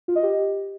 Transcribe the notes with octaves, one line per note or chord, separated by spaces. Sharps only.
F4
D#5
G4